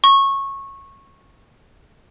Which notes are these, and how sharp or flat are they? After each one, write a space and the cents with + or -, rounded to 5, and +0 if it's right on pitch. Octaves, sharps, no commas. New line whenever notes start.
C#6 -15